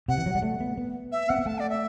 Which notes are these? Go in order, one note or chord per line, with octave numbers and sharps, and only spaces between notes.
C3 F#5
E3
F#3
G3
A3
B3
B3
E5
C4 F#5
B3
A3 A5
D5
E5